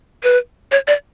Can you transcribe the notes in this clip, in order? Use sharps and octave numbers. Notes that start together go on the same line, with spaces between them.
B4
C#5
D5